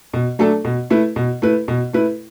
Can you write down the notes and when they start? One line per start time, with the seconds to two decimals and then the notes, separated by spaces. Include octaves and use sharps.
0.13 B2
0.39 F#3 A3 D4 A4
0.65 B2
0.90 A3 E4 B4
1.16 B2
1.42 A3 E4 B4
1.68 B2
1.93 A3 E4 B4